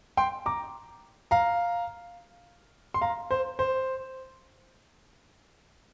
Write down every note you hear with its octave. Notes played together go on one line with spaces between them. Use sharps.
G5 C6
A#5 D6
F5 A#5
C6
F5 A#5
C5
C5